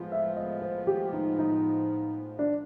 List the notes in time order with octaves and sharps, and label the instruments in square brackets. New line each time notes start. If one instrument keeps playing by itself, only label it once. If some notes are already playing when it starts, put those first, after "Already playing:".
Already playing: [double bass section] A2 F3 G#3 B3
[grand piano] E5
D#5
C5
G4
D#4
D#4
D4